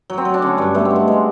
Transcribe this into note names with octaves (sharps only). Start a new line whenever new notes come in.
F#3
C4
F#3
D4
D3 C#4
G2 D4
A3 B3
C4
G#3
B3
G#3 C4